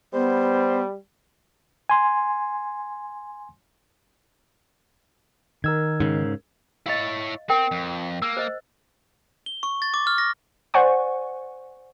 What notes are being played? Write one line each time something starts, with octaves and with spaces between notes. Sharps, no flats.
G3 B3 C5
G#5 C6
D#3 A#4 E6 G#6
G#2 C#3
E4 C#5 D#5 F5
C4 A#4 G5
F2
A#3 E6
C5 D#5
G7
C#6
A6
D6
F6
A#6
C5 D5 F#5 G#5 C#6